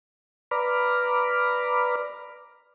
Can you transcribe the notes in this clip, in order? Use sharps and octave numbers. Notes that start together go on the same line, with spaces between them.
B4 D5 A#5 B5 D6 F6